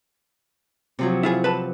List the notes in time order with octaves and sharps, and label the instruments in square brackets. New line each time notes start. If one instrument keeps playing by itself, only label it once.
[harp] C3 F3 F#3
[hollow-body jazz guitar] E4 F4 G#4
B4 A5